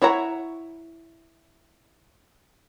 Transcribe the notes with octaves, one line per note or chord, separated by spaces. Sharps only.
E4 C#5 F#5 A#5